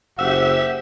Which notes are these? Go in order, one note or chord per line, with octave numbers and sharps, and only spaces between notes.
F#1 G4 C5 E5 F#5